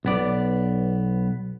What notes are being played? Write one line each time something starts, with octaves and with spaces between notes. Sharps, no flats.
B1 B3 D5